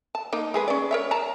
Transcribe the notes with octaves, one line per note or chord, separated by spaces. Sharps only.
A5
A#3 D#4
G#3 G#4 B4
C#4 D5
A#4 C#5 E5
A5 A#5